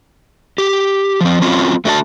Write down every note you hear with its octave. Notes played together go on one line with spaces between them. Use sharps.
G4
F3 C4
F#3 C4 C#4 F4
A3 D4 F#4 D#5 A5